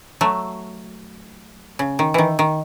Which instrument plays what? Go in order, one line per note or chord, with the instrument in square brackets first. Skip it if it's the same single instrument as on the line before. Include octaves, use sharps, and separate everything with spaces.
[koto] F#3 A3
C#3
D#3
D#3 E3
D#3